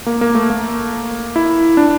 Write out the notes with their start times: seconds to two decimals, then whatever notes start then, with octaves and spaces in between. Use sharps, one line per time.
0.06 A#3
0.21 A#3
0.35 A3
0.50 A#3
1.36 E4
1.77 D4